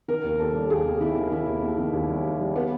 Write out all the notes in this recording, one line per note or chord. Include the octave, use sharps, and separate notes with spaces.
D#3 A#4
D#2
D#2 A4
G3
D#2 G#4
D#2
D#3 E4
D#3
D#3 E4
D#2
D#2
D#3
D#2
G3
G3
G3
G3 B3